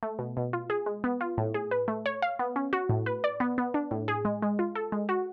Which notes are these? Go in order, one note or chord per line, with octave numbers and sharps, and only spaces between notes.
A3
B2
B2
F4
G#4
G#3
B3
F4
A2
G#4
B4
A3
C#5
F5
B3
C#4
F#4
A2
B4
D5
B3
B3
D4
A2
G#4
G#3
G#3
F4
A4
G#3
F#4